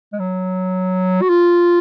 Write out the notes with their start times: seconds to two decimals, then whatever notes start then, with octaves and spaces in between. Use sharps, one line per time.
0.13 G#3
0.19 F#3
1.22 F#4
1.29 F4